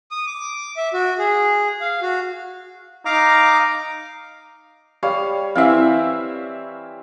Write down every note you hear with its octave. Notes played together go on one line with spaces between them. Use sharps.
D#6
D6
E5
F#4
G#4
F5
F#4
D#4 F5 A#5 D6
G3 C#5 F5
E3 C4 E4 E5 F5